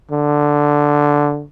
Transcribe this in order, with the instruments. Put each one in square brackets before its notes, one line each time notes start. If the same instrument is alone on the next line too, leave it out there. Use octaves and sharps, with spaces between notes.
[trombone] D3